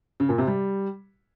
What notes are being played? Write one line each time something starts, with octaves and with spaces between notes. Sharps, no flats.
C#3
A#2
C3
G3